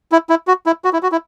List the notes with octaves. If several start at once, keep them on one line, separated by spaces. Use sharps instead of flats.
E4
E4
F#4
E4
F#4
E4
F#4
E4